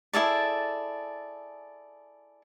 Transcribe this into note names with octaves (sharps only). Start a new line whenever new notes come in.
E4 G#4 A4 D5